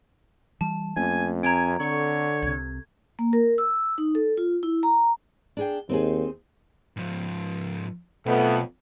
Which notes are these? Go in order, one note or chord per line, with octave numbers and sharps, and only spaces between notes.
E3 G3 A5
F2 A3 A#3 C#4 G#5
C4 G#5 A#5 G#6 D7
D3 A4 C#5 C#6 C#7
C2 C3 G#6
A#3
A#4
E6
D#4
A4
F4
E4
A#5
D4 G#4 G5
D#2 C4 D#4 G#4
G#2 F3
B1 F2 A3 B3